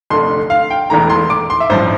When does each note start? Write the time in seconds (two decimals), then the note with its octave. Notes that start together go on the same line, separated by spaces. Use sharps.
0.10 F1 F2 D3 A3 C6
0.50 F5
0.70 G5
0.90 E1 E2 E3 A3 A#5
1.10 C6
1.30 D6
1.50 C6
1.60 E5
1.70 A1 G2 F3 C5